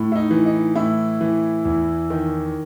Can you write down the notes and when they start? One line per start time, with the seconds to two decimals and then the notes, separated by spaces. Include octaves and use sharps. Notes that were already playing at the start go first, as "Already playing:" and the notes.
Already playing: A2
0.12 E4
0.16 D#4
0.31 E3
0.46 D#4
0.75 A2 E4
1.21 E3
1.65 E2
2.10 D#3